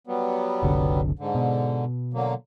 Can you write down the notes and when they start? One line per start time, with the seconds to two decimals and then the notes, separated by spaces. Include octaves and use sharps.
0.07 F#3 G3 B3
0.63 F#1 C2 D3
1.19 G#2 D3
1.35 B2
2.14 D3 F#3 A#3